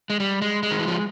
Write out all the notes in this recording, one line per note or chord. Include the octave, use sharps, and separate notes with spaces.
G#3
G3
G#3
G#3
D#3
E3
F3